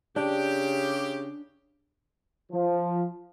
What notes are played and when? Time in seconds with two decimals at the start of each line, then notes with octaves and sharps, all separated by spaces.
0.16 C#3 D4 G4
2.52 F3